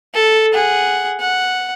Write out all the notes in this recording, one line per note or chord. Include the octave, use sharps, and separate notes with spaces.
A4
G#4 F#5
F#5